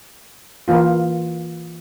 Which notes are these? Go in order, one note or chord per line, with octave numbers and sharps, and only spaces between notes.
E3 A#3 F4